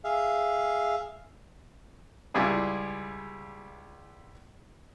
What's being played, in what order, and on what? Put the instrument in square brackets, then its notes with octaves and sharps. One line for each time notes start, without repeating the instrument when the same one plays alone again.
[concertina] G#4 E5 F5
[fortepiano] C#2 G3 E4 F4 G#4 B4